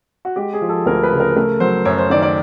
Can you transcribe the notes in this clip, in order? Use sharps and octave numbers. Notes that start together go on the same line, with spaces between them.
F#4
G#3 G4
G#4
F3
A4
D2 A#4
B4
C#3
A#4
A3 A#4
F#3 C5
F#2 C#5
C5
D#3 D5
D5